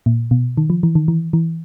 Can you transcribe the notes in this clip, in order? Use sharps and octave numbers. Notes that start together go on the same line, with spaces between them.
A#2
B2
D#3
F3
E3
D#3
E3
E3